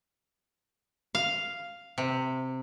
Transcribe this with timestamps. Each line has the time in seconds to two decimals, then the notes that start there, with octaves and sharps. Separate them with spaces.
1.15 F5
1.98 C3